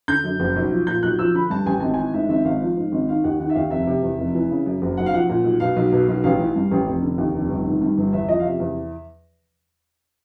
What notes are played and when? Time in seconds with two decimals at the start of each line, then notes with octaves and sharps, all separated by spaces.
0.08 D3 G6
0.24 F#2
0.40 F#1
0.56 B1
0.71 F3
0.87 A#2 G6
1.03 B1 F#6
1.19 F3 E6
1.35 D3 B5
1.50 G2 A5
1.66 A1 G#5
1.80 G#1 A5
1.94 E3 G#5
2.14 G#2 E5
2.29 G#1 E5
2.45 G#1 F5
2.61 F3
2.77 G#2
2.92 G#1
3.08 D#3 F5
3.24 D#2 F#5
3.40 D#3 F#5
3.50 E5
3.55 D#2 F5
3.71 F1 E5
3.87 C3
4.03 E2
4.18 F1
4.35 E3
4.50 C#3
4.66 F#2
4.82 F#1
4.97 B1 F#5
5.06 F5
5.13 F3 F#5
5.30 A#2
5.44 B1
5.60 B2 F5
5.76 B1
5.93 B2
6.08 B1
6.24 A1 F5
6.39 E3
6.56 G2
6.71 A1
6.86 F1
7.02 D3
7.18 D#2
7.34 F1
7.50 G1
7.65 D#3
7.81 G2
7.97 G1
8.13 E2 E5
8.28 F3 D#5
8.39 F5
8.44 C3 E5
8.60 E2